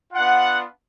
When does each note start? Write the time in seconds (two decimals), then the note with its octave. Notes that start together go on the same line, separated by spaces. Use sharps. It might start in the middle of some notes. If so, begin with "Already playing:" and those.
0.13 B3 D4 F4 F#5